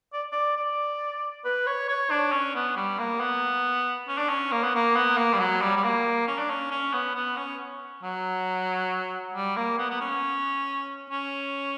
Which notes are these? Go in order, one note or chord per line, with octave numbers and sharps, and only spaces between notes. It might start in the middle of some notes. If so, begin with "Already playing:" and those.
D5
D5
D5
B4
C#5
C#5
D4
C#4
B3
G3
A#3
B3
C#4
D4
C#4
A#3
B3
A#3
B3
A#3
G3
F#3
G3
G3
A#3
C#4
D4
C#4
C#4
B3
B3
C#4
F#3
G3
A#3
B3
B3
C#4
C#4